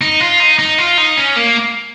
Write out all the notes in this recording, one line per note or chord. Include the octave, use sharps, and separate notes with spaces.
D#4
F4
D#4
D#4
F4
D#4
C#4
A#3